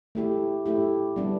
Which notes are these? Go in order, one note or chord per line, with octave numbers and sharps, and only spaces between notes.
A3 E4 G4
A3 E4 G4
G3 B3 D4